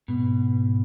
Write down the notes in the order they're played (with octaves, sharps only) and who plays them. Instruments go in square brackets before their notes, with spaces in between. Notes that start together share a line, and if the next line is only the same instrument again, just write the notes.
[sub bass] G#2 [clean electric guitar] B2